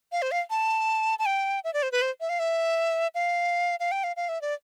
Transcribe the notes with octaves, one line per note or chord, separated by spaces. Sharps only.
F5
C5
F5
A5
A5
G5
E5
D5
C5
B4
C5
E5
F5
E5
F5
F5
G5
F5
F5
E5
D5